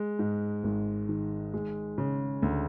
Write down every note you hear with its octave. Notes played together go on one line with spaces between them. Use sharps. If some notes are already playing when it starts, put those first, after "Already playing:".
Already playing: G#3
G#2
G#1
D#3
G#3
C#3
D2